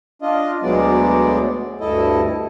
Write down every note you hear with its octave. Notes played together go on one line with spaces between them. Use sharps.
D4 F4 D#5
D2 B2 F#3 G#3 B3 D5
D2 G2 E4 A4 D#5